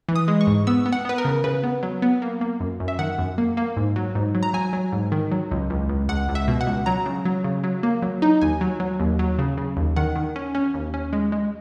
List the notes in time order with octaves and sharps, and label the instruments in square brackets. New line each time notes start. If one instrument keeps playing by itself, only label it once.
[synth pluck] E3
D#6
G#3
C#6
G#2
B3 E6
B3
F#5
B3 B4
A#4
C#3
C#3 B4
B3
F#3
B3
A#3
A#3
F#2
F#2
E5
D#3 F#5
F#2
A#3
A#3
G#2
F#3
G#2
F#3
A#5
F#3 G#5
F#3
G#2
D#3
F#3
C#2
C#2
C#2
C#2 F#5
C#2
E5
B2
F#5
C#2
F#3 A#5
C#3
F#3
C#3
F#3
A#3
F#3
D#4
D#2 G#5
F#3
F#3
D#2
F#3
C#3
C#3
D#2
D#3 F#5
D#3
C#4
C#4
D#2
C#4
G#3
G#3